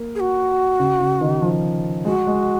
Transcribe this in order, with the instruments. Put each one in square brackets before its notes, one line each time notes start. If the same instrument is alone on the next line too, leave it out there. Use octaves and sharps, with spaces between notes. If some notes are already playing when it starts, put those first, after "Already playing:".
Already playing: [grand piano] A#3
[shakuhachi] G#4
F#4
[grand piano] C#3
C#3
D#3
F3
[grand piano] G#3 [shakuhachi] F#4
[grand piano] G#3